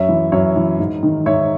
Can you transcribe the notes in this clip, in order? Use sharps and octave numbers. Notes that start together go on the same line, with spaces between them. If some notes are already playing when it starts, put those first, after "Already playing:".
Already playing: F#2 C#5 E5
E3
F#2 C#5 E5
E3
G#2
D#3
G#2 C#5 E5